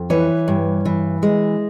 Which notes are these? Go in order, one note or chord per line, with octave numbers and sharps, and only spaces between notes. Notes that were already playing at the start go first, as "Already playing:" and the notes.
Already playing: F2
E3 B4 C#5
G2
E3
G#3